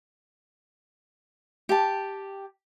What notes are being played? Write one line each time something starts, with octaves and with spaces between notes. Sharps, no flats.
G4 A5